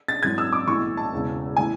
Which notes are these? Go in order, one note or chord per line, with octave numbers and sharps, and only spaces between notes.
A6
G#1 F#2 E3 G#6
E6
D6
B1 A2 E3 C#6
A5
E1 E2 C#3
A2 E3 G#5